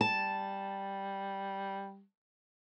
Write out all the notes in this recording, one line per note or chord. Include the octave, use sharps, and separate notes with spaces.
G3 A5